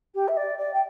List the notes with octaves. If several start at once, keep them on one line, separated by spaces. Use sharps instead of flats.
G4
E5
D5
D5
G5